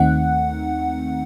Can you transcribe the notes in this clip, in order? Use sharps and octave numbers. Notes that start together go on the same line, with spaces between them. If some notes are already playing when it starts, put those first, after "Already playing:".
Already playing: D#2 D#3 A3 C4 D#4 F#5